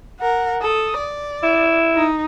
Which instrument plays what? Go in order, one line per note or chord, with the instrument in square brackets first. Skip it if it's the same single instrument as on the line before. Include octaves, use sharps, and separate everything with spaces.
[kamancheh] A#4 F#5
A4 D#6
D5
[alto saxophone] E4
[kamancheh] D#4